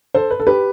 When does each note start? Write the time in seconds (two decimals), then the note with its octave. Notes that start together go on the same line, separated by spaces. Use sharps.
0.14 A4 C5
0.31 B4
0.40 A4
0.47 G4 B4